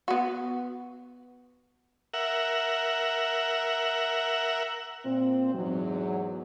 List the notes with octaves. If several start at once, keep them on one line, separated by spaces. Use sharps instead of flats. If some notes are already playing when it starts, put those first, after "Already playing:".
B3 F#4
A#4 E5 F#5
A#2 C4
E2 G#2 F#3